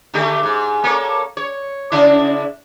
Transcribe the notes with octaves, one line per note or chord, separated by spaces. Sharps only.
D3 A3 G4
G#2
A#3 A4 C#5
C#5
C#3 D4 E4